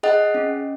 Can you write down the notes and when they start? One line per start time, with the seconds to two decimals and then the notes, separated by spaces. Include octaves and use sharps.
0.03 G#4 D#5 F#5
0.34 C#4